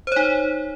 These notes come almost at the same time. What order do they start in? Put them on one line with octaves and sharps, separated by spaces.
C5 C#5 D#4